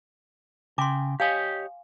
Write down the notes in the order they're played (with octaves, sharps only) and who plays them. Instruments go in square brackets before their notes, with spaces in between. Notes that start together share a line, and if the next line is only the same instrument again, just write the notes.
[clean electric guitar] C#3 G5 [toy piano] C6 D6
[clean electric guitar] G4 C#5 D#5 [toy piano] F5 G#5